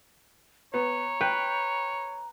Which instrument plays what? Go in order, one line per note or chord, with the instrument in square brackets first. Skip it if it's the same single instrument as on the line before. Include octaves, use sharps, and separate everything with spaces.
[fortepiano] B3 [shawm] C#5 [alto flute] A#5
[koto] B4 [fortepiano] G5